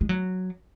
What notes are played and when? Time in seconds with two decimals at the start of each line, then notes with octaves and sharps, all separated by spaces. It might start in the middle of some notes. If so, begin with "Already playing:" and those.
0.01 G#3
0.09 F#3